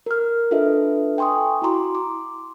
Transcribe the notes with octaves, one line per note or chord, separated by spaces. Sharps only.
A#4 F6
D4 F4 A4 B4 D#5 E5
G5 G#5 C6 C#6 D#6
E4 F#4 A#5 C6 D6
D6